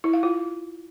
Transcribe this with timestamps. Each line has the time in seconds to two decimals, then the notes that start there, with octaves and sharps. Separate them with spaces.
0.04 E4
0.14 F5
0.23 F4